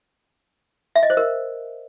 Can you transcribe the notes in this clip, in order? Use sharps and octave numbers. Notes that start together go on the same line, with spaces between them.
E5
D#5
C5
A#4